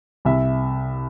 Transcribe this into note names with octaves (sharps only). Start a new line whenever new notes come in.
C2 E5